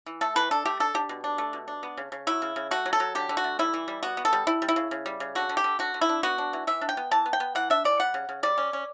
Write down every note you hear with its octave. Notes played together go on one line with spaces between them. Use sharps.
E3
A3 A4
E3 B4
D4 A4
A3 G4
D4 A4
D4 G4
B2
D4
A3
B2
D4
B3
C#3
C#3
F#3 E4
C#3
C#3
A3 F#4
F#3
A4
F#3
D3 G4
D3
F#4
A3
G3 E4
E3
G3
B3 F#4
B3
A4
G3
G3 E4
G3
E4
C#3
C#3
G3
C#3
D3 F#4
D3
G4
D3
D3 F#4
D3
E4
D4
B3 F#4
D4
E3
E3 E5
D4
G5
B3
E3 A5
B3
G5
B3
E3 F#5
D4 E5
E3 D5
G3 F#5
C#3
C#3
G3 D5
C#4
C#4